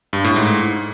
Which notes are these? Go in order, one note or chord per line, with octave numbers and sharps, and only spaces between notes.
G2
A2
G#2